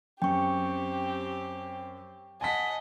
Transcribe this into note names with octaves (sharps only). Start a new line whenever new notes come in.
F#2 C4 G4 G5 C#6
D#5 F#5 G#5 A5 B6